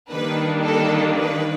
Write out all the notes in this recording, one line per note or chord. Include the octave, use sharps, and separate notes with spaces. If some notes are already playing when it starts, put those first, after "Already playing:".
D#3 G3 A#3 D4 B4
A4
B4